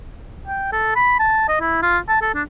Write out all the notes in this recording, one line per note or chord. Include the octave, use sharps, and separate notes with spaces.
G5
A4
B5
A5
D#5
E4
F4
A5
A4
D4